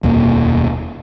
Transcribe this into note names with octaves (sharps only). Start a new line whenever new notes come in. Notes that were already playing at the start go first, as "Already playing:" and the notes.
F1 D#2 B2 A#3